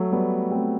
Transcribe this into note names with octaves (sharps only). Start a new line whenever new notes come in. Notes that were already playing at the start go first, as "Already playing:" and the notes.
Already playing: F#3 A3
G3 B3
A3 C4